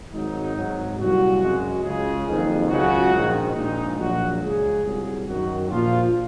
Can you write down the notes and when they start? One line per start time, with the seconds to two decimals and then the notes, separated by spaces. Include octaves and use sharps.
0.12 G#1 G#2 D#3 F#3 D#4
0.55 G#1 G#2 F#3
0.98 C2 A#2 F#3 F#4
1.42 F#2 C#3 G#3
1.84 C#2 C#3 G#3 G#4
2.27 F#1 F2 D#3
2.69 C#2 C#3 F#3 F#4
3.13 A#1 G#2 D#3 G#3
3.55 A#1 A#2 G#3 D#4
3.99 A#1 A#2 F#3 F#4
4.42 C#2 C#3 G#3 G#4
4.85 C2 A#2 F#3
5.27 F#2 D#3 F#3 F#4
5.70 A#1 A#2 F3 F4